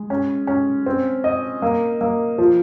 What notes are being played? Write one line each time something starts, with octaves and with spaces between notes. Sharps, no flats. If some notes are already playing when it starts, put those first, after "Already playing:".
Already playing: G#3
C#4
C#4
C4
D#5
A#3
A#3
F3